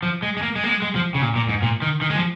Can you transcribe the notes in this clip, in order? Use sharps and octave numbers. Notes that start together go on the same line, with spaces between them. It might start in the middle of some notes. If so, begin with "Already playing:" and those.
F3
G#3
G#3
A#3
G#3
A#3
G#3
G#3
F3
C#3
A#2
A#2
G#2
A#2
D#3
D#3
G#3
F3